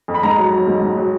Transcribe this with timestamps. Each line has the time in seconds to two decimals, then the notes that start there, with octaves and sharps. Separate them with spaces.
0.08 F2
0.14 B5
0.23 G#2 A#5
0.38 F#3
0.52 F#3
0.67 G#2
0.82 G#2
0.97 F#3